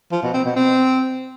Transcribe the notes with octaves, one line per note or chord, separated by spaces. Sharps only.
F3
B2
C4
B2
C4